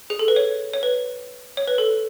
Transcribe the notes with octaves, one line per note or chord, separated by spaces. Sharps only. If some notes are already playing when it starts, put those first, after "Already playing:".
G#4
A4
B4
C#5
C#5
B4
C#5
B4
A4